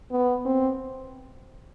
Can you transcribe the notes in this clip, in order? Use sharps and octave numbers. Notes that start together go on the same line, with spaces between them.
B3
C4